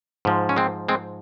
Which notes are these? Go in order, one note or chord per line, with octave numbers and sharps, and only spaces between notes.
G#2 F3
C#4
G#3 C4
G#3 C4